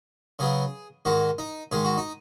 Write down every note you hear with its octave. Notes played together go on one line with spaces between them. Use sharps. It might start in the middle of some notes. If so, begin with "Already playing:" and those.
C#3 F#3 B3 G#4
G#2 D#3 G#3 F#4
D#4
G#2 D#3 G#3 G#4
F#4
D#4